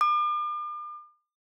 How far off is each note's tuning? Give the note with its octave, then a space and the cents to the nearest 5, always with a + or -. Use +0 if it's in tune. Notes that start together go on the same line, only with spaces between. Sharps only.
D6 +40